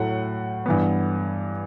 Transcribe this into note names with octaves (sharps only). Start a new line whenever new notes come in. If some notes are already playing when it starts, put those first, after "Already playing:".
Already playing: A2 F#3 A3 F#5
G2 E3 B3